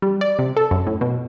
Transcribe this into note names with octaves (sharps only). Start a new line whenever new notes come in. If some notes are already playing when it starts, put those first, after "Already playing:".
G3
D5
C3
A4
F#2
A2
B2